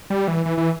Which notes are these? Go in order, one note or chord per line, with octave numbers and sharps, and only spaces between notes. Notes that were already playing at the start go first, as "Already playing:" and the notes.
G3
E3
E3
E3